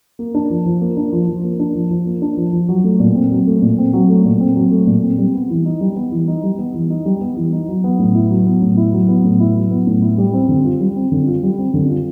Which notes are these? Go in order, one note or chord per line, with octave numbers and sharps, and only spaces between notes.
A#3
D4
F3
F3
A#3
D4
F3
F3
A#3
D4
F3
F3
A#3
D4
F3
F3
F#3
A3
A#2
C4
F#3
A3
A#2
C4
F#3
A3
A#2
C4
F#3
A3
A#2
C4
G3
B3
E3
D#4
G3
B3
E3
D#4
G3
B3
E3
D#4
G3
B3
E3
D#4
F#3
B3
A2
E4
F#3
B3
A2
E4
F#3
B3
A2
E4
F#3
B3
A2
E4
G3
C4
D3
F4
G3
C4
D3
F4
G3
C4
D3
F4